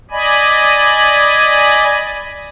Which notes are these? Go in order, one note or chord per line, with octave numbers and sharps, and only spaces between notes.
D5 D#5 G#5 B5